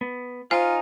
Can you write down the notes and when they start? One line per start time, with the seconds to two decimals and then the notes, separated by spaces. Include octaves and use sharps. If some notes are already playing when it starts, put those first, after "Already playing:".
0.01 B3
0.51 D#4 F4 C5 G#5 F6